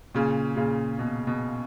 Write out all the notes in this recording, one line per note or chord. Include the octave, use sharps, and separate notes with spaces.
A#2 C#3
A#2 C#3
B2
B2